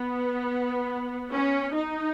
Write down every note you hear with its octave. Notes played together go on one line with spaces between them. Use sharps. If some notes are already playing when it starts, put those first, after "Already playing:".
Already playing: B3
C#4
D#4